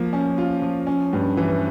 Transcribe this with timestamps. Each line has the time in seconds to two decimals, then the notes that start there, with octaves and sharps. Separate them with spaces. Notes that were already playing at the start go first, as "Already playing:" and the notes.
Already playing: F3 A#3
0.13 C#4
0.38 F4
0.62 F3
0.87 C#4
1.13 G2
1.37 E3